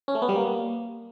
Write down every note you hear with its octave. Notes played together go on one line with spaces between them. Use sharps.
C#4
A3
B3
G3
A#3